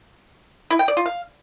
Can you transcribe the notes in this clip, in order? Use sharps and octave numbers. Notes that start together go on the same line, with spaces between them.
E4
G5
D5
F4
F5